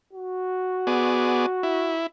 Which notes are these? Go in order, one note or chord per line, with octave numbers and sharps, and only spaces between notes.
F#4
B3 G#4 D5
E4